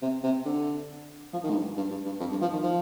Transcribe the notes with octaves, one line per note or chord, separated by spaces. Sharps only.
C3
C3
D3
F3
D#3
G#2
G2
G2
G2
G2
F2
G2
F3
D#3
F3